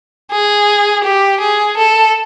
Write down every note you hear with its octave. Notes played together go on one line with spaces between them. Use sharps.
G#4
G4
G#4
A4